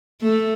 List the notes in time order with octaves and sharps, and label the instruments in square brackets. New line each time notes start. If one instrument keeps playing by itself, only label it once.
[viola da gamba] A3